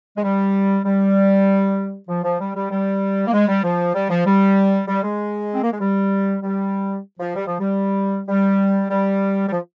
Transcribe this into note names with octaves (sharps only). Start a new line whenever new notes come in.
G#3
G3
G3
F3
F3
G3
G3
G3
A#3
G#3
G3
F3
G3
F3
G3
G3
G#3
C4
A#3
G#3
G3
G3
F3
G3
F3
G3
G3
G3
G3
F3